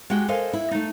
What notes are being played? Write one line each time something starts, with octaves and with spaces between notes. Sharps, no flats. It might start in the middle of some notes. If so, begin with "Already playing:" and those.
G#3 F#4 G4 F#5 G5
A4 A#4 C5 D#5 F5 G#5
E4
A3 D#4